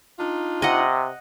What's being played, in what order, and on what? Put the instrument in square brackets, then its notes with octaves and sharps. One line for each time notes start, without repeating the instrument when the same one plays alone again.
[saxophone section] D4 D#4 F4
[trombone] C3 [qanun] D#5 F#5